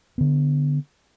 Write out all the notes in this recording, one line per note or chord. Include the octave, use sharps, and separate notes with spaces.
D3 B3